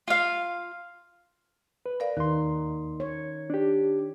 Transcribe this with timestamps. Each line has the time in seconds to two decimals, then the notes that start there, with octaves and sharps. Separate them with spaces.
0.08 F4 F5
1.86 B4
2.00 A#4 D5 F5
2.17 D#2 D#3 D#4 C6
3.00 C#5
3.50 D4 G4